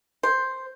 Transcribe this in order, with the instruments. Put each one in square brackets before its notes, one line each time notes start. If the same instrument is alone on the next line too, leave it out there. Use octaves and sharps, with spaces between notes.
[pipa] C5